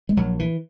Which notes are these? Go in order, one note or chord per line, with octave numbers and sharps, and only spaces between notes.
G#3
A#1 F#3
E3